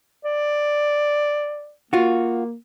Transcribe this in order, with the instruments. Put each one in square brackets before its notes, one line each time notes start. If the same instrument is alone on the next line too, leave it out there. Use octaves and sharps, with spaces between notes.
[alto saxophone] D5
[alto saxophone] A#3 [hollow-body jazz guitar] F4 F#4